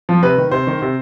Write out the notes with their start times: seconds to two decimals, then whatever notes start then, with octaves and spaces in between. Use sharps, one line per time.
0.09 F3
0.22 C3 B4
0.38 D#3
0.51 C3 C5
0.67 D#3
0.82 C3